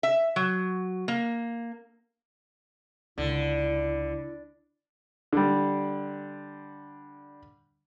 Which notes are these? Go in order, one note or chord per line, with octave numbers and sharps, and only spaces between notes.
E5
F#3
A#3
C#2 D3 E4
D3 G3